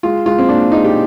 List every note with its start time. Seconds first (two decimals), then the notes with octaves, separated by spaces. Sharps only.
0.03 G#3 F4
0.26 G#3 F4
0.38 C4
0.49 A#2 D4
0.72 G#3 D#4
0.84 G4